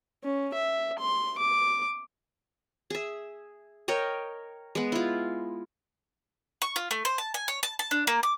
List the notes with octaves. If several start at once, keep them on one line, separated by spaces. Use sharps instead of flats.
C#4
E5
C6
D6
G#4 E5
A#4 C#5 D#5 G5
G#3 B3
E4 F4
C#6
F4
A3
C5
A5
G#5
C#5
A5
A5
D4
A#3
D6